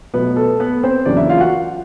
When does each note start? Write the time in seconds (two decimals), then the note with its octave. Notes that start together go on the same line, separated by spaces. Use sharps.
0.14 B2 F#3 A3 B3 B4
0.36 A4
0.60 B3 B4
0.83 C4 C5
1.06 E2 C#3 F#3 A#3 D4 D5
1.17 E4 E5
1.29 F4 F5
1.40 F#4 F#5